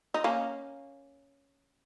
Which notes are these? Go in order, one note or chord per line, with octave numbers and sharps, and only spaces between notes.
D#4
A#3 C#4